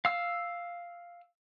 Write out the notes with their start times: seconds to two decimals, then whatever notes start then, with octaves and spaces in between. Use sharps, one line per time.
0.05 F5 E6